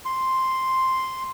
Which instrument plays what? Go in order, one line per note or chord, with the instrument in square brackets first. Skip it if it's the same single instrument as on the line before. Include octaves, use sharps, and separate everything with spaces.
[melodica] C6